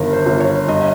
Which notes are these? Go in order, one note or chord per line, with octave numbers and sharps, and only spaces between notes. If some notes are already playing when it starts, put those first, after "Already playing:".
Already playing: G1 G2 D#3 A#4
C5
G1
C#5
G2 D#5